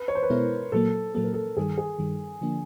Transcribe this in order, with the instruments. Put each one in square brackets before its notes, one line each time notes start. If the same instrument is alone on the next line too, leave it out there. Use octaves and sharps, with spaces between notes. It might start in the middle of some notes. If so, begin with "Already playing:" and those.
Already playing: [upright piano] B4
C#5
C5
B4
[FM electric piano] B2 G#3 B3 E4 [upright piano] A#4
[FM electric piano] A#2 F#3 A#3 [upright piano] A4
[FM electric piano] A#2 F#3 A#3 [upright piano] A4
[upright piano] A#4
A4
[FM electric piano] G2 D#3 G3 [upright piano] G#4
[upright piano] G#4
[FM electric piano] G2 D#3 G3
D3 F3 A#3 D4